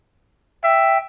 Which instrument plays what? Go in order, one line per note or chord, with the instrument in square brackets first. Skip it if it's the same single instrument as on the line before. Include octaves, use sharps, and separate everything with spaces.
[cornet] E5 [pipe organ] G5